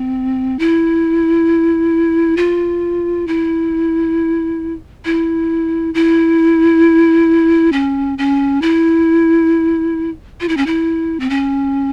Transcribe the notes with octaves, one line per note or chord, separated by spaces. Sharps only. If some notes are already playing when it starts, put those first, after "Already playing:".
Already playing: C4
E4
F4
E4
E4
E4
C#4
C#4
E4
F4
E4
C#4
E4
C4
C#4